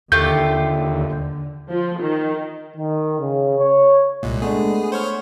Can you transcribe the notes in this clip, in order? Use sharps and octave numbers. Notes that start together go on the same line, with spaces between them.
D#2 D3 A3 F4 G4 G6
F3
D#3
D#3
C#3
C#5
C2 A#2 G#3
A3 B3 D4 G#4
C5 C#5 F#5 F6